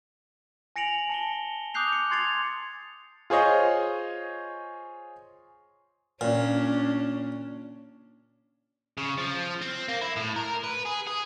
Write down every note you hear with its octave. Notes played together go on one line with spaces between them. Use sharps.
G#5 A#6 C#7 D7 F7 F#7
A5 C#7 G7
D6 D#6 F#6 G6 C7 F7
C#7
C6 G#6 A6 C7 C#7 F7
F4 G#4 C5 C#5 D#5
A#2 C#4 D4
C#3
F3
C4
A#3
E4
A2
A#4
B4
G#4
G#4